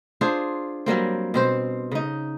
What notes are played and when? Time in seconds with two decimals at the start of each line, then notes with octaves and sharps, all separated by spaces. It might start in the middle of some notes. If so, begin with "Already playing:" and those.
0.21 D4 F4 G#4 C5
0.86 F#3 G3 A#3 C4
1.34 B2 C4 C5
1.92 C#3 D#4